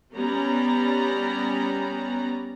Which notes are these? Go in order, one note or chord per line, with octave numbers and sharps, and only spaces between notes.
G3 B3 C#4 D5 A#5